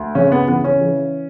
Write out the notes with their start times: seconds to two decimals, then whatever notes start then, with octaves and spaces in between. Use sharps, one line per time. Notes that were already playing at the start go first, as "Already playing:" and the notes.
Already playing: D2
0.15 C#3 C#4
0.32 B3
0.48 E3 B3
0.64 C#4
0.81 E3